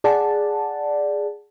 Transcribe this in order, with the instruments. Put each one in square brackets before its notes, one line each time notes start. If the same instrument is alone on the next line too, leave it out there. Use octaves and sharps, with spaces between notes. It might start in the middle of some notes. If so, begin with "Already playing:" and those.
[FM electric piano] G#4 D5 F#5 A5